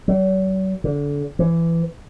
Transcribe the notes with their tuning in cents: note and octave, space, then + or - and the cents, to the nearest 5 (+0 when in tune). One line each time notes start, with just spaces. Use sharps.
F#3 +45
D3 -25
E3 +20